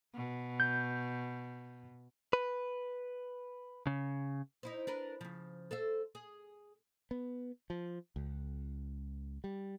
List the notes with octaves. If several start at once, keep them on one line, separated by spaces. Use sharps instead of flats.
B2
G6
B4
C#3
D#4 E4 C5
D4 A#4 B4
C#3 F3
A4 C5 E5
G#4
B3
F3
C#2
G3